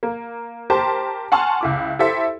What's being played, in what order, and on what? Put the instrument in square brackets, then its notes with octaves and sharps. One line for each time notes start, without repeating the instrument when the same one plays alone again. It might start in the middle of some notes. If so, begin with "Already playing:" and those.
[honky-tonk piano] A#3
G4 A#4 C5 A5
F#5 G#5 A5 C6 C#6 F6
C#2 E4 D6
E4 G4 A4 C5 E5